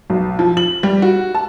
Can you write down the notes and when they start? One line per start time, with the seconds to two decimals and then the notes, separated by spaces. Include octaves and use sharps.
0.10 B1
0.39 F3
0.57 F#7
0.83 G3
1.02 F#4
1.35 A5